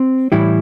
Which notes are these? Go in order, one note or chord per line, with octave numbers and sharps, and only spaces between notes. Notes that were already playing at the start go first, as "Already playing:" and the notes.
Already playing: C4
A2 E3 G3 E4